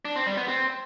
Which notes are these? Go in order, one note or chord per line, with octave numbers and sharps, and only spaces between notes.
D4
C4
G3
B3
C4